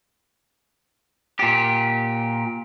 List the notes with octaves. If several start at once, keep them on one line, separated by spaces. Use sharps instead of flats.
A#2 G4